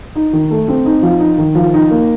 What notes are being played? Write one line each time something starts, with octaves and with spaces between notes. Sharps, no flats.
D#4
D#3
A3
C4
D#4
F3
D#4
D#3
F3
D#4
A#3